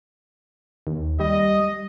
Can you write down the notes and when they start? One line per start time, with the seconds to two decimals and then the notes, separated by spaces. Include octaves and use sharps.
0.87 D#2
1.20 G3 D#5